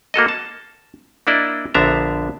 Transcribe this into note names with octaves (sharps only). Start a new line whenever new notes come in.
A#3 F#4 A4 D#5
A5
A#3 D4 E4 D5 D#5
A#1 D3 B3 D4 E5 A#5